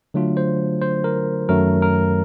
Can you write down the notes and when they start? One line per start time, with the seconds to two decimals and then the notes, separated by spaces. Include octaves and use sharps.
0.14 D3 F#3 A3 D4 F4
0.37 C5
0.82 C5
1.04 A#4
1.49 F#2 D#3 F#3 A3 A#4
1.82 A#4